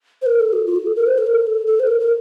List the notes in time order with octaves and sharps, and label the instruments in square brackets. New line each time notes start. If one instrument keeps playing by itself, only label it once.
[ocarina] C5
A#4
A4
F#4
F4
F#4
A4
A#4
C5
A4
A#4
A4
A4
C5
A#4
A#4